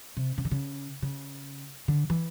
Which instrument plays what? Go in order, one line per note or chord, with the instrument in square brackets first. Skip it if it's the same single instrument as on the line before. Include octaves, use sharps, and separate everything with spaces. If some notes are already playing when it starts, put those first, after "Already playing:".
[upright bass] C3
C#3
D3
C#3
C#3
D3
E3